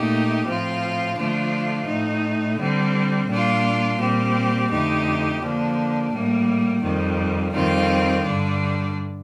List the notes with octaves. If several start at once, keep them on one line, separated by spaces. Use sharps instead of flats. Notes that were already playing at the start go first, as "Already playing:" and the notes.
Already playing: A#2 A3 D#4 G4
A2 F3 C4 F4
D3 F3 A3 D4 F4
A2 A3 D#4
D3 G3 C4
A#2 G3 D4 F4
A#2 G3 C4 G4
F2 D3 A3 D#4 G4
D3 F3 A#3 D4
A2 G3 A#3
F2 D#3 G3
F2 D#3 G3 C4 F4
G2 D3 G3 D4